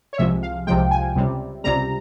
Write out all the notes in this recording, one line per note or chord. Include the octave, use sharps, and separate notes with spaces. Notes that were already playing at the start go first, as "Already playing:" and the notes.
C#5
C2 C3 F3 G#3 E5
F5
C2 C3 F3 G#3 G5
G#5
C#2 C3 G3
C#2 C3 G3 A#5